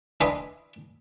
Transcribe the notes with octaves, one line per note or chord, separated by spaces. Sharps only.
D4 B4 D#5 E5 G#5 C6